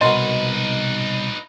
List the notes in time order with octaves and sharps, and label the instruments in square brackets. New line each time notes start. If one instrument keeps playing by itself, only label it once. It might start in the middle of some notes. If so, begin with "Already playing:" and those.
[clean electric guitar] C2 B2 [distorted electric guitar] D#4 B4 [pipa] F#4 A#4 C6 [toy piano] D#5